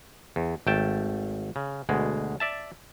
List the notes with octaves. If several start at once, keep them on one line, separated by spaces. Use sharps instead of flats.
E2
G#1 A3 G5 A5
C#3
D2 B2 G#3
D5 E5 A5